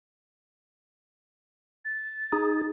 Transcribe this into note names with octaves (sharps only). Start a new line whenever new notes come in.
A6
D#4 G#4